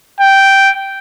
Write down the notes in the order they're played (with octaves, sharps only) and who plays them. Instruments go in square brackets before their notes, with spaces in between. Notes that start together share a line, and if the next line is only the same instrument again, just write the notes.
[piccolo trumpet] G5